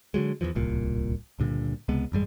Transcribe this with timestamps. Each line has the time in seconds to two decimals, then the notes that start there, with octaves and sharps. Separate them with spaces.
0.14 D3 F3 F#3 G#3
0.41 E2 C3 E3 F3
0.55 D1 C2 A#2
1.39 C#2 G2 A#2 D3
1.88 C#2 C3 G#3 B3
2.12 A1 F#2 G3 G#3